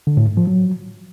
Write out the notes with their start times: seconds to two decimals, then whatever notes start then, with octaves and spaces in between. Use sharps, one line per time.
0.07 D3
0.17 A2
0.27 G#2
0.37 F3
0.47 F#3